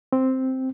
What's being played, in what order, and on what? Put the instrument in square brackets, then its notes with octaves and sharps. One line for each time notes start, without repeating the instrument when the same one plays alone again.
[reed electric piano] C4